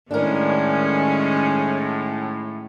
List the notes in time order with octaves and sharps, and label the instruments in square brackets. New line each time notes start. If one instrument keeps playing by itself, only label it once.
[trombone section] A2 [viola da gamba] D#3 G#3 C#4 [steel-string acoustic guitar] D4 A#4